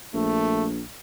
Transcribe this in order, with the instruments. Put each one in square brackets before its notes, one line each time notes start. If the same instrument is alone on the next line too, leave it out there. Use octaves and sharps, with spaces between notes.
[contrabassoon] A#1 [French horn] A3